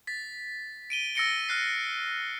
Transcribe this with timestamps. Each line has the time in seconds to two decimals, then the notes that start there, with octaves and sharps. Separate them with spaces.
0.07 A6 B6
0.90 D7 D#7 G7
1.15 E6 A6 A#6 C#7 D7 G7
1.49 F6 F#6 C7